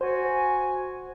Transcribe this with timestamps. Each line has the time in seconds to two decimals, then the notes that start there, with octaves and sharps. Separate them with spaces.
0.01 F#4 C5 G#5